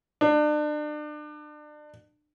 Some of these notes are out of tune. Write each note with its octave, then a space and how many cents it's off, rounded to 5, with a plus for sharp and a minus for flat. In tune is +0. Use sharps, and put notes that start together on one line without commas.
D4 +35